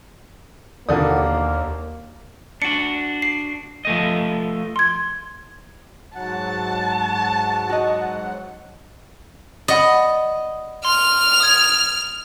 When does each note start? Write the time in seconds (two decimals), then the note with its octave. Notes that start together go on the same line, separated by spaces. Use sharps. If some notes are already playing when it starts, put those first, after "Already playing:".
0.89 D#2 B2 D3 A#3 D5 F#5 D#6
2.62 D4 F#4 C#7
3.22 C7
3.85 F3 A3 D#5
4.76 C6 G#6
6.15 G#2 F#3 F#5 A5
7.69 F#4 D#5
9.68 D5 D#5 F#5 B5
10.85 C6 F6
11.40 D#6 G#6